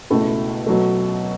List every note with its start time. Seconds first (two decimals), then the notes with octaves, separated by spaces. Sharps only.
0.10 C#2 B2 A3 E4
0.66 B2 F#3 A3